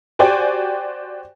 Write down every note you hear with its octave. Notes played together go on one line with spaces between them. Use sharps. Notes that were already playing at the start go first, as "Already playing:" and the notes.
F#4 G4 C5 D5 G5 G#5